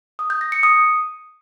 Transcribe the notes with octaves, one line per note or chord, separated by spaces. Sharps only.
D#6
G6
A#6
C#7
D#6